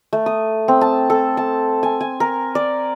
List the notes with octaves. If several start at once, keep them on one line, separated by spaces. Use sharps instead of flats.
A3
D#6
C4
A5
A4
A5
G#5
G#5
A#4
D5